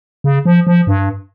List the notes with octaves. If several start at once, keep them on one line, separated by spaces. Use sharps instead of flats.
C#3
F3
F3
G2